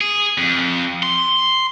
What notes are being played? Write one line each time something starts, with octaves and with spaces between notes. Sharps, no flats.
G#4
F2
C6